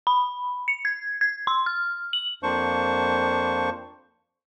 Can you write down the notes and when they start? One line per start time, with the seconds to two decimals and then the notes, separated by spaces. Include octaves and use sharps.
0.07 B5
0.68 C#7
0.85 G#6
1.21 G#6
1.47 C6
1.66 F6
2.13 F#7
2.43 F2 A#3 D4 C5 C#6